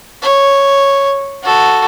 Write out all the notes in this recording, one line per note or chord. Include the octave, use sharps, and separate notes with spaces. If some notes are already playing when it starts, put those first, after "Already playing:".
C#5
F#4 A4